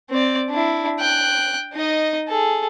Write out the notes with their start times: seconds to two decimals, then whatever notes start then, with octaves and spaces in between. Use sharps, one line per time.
0.10 C4 D5
0.50 D4 E4
0.99 G5 F#6
1.74 D#4 D#5
2.28 G#4 A4